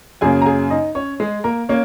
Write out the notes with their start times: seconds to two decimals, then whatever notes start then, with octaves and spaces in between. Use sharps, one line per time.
0.21 F#2 C#3 A#3 C#4 G#4 G#5
0.42 A#5
0.46 G#4 G#5
0.70 D#4 D#5
0.95 C#4 C#5
1.20 G#3 G#4
1.44 A#3 A#4
1.69 A#3 C#4 C#5